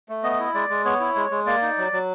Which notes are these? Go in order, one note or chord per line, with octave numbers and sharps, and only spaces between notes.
A3
B3 D#5
E4
G#3 D5
G#3
B3 C#5
E4
G#3
G#3
A#3 D5
D#4
F#3
F#3